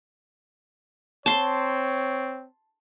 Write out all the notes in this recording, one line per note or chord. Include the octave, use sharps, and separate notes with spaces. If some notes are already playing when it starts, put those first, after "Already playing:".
C4 C#5 A5 C6